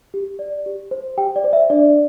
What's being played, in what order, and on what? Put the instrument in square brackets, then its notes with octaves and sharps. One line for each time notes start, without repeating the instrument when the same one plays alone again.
[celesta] G4
D5
G4
C5
G4 G5
D5
C5
E5
D4 D5